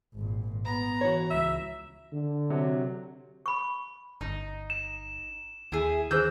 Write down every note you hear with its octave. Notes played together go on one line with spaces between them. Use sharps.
G#1 A#2
B3 A#5
E3 F#4 C#5
C#2 E5
D3
C3 F#3
B5 C#6
G1 D#4
E7
D#2 E4 G#4
D#3 E4 G#4 C5 D#6 E6 G6